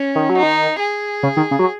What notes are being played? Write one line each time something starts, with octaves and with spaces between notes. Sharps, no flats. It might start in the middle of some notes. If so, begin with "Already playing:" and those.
Already playing: C#4
D#3
F#3
D#4
D#3
G#4
C#3
D#3
C#3
F#3